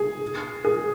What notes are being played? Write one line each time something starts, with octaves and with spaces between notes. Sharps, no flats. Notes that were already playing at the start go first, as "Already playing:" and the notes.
Already playing: G#4
G#4